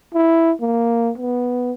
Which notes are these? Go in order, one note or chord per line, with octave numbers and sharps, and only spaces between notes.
E4
A#3
B3